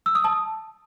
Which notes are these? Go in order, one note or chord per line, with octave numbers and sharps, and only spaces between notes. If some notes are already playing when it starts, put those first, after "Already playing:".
E6
D#6
A5